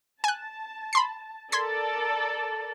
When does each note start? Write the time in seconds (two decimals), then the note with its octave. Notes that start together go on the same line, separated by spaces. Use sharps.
0.24 G#5 A5 F#6
0.93 B5 C6 C7
1.52 A4 A#4 D5 C6 G#6 B6